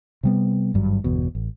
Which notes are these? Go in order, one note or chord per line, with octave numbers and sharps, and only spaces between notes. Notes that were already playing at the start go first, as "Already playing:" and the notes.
C3 G3 B3
G#1 G2 F#3
G1 E2 B2
A1